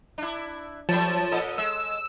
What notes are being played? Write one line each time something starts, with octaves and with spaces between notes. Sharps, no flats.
D4 E4
F3 F#3 A3 C#5 A5
A#2 A4 D#5
G#3 E6